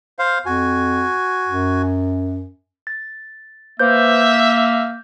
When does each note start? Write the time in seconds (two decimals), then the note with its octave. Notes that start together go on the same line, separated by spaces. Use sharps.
0.19 C5 F5
0.46 F2 F#4 G#5
1.47 F#2
2.87 A6
3.79 A#3 B4 C5 E5 G6
4.22 G6